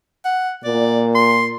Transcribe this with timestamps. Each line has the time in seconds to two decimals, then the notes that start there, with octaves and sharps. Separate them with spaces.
0.25 F#5
0.64 A#2 D5
1.15 C6